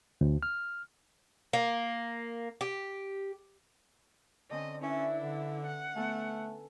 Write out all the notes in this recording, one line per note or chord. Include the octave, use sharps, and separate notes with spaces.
D2
F6
A#3
G4
D3 C4 C#4 D#5
C#4 D4 E4 B4 E5
D3
F#5
A3 B3 A4 G#5